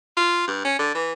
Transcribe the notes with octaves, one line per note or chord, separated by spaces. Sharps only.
F4
G2
C#4
D3
E3